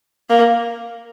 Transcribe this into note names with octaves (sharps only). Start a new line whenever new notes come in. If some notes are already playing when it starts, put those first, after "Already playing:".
A#3